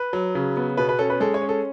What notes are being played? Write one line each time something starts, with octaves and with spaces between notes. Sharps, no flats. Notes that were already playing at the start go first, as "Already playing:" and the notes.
Already playing: B4
F#3
C#3
B3
B2 B4
B4
C#4 A4
B4
G#3 A4
C#5
C#4
A4